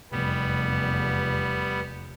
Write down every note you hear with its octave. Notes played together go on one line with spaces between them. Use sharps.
F1 E2 G3 B3